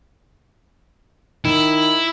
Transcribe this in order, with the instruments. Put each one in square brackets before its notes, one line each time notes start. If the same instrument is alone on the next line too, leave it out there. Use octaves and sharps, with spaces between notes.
[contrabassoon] D#3 [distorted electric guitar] E4